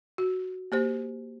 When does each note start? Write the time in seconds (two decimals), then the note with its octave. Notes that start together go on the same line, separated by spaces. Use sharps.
0.18 F#4
0.72 A#3 G4 C5